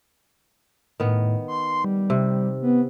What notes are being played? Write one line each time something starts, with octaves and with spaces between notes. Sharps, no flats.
A2 D#3 B3
C6
G3
C3
B3